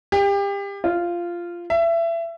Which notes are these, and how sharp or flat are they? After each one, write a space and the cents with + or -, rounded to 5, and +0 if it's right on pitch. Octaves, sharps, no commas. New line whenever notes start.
G4 +30
F4 -10
E5 +25